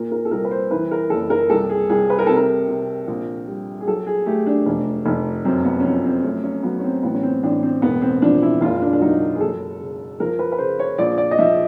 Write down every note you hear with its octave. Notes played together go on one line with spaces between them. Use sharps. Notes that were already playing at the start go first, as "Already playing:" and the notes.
Already playing: A#2 A#4
A#4
A4
C2 A#4
B4
C5
E3 B4
A#4
F#1 A4
A#4
C2 A4
G#4
C2 G#4
B4
A#4
C3 A4
A#4
C3
A#1
G3
G#4
F#3 A4
G#4
A3 G4
D4
F1
F1
F#2 C4
B3
C#4
F3 C4
C4
A3 C#4
C#4
F#3 B3
C#4
C4
A1 B3
C#4
C4
A1 D4
C4
E1 B3
C4
F3 D4
E4
F#1 F4
D4
D4
F#3 D#4
G#4
F#1 A4
C#3
F3 A#4
B4
B4
C#3 C5
C#5
A#1 D5
D5
D#5
F3 E5